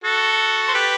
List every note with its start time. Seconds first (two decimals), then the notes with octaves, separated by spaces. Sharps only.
0.04 F#4 A4
0.68 C5
0.74 G4 B4